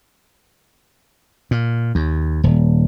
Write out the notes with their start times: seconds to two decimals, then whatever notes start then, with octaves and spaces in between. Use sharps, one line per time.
1.51 A#2
1.95 D#2
2.44 D#1